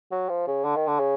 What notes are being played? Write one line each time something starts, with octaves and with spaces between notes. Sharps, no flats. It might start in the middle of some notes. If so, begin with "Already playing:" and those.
F#3
F3
C#3
D3
D#3
D3
C#3